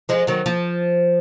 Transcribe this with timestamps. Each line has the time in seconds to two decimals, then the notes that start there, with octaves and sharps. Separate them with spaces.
0.09 F3 G#3
0.27 D#3 F#3
0.46 F3